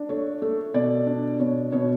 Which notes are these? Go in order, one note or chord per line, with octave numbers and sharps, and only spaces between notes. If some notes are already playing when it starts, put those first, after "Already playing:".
Already playing: D4
A3 C#5
A3
B2 D5
D4
B2 C#5
B2 C#5